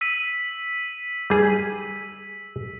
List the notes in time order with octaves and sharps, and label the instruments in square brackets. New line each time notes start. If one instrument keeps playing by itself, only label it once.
[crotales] E6 B6 D#7
[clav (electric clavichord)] G3 G#4